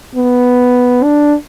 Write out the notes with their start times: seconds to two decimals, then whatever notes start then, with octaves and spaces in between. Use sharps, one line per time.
0.15 B3
1.04 D4